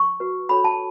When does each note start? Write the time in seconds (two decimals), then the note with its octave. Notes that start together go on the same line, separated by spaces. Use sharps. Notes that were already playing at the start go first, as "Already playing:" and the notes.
Already playing: C#6
0.20 F#4 B4
0.49 D4 F#4 A4 C#5 B5
0.64 A5